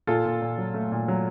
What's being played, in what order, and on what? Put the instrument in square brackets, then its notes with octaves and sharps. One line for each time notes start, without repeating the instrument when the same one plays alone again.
[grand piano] A#2 F4 A4
A#2
A#2
F#3
A3
A#2
F#3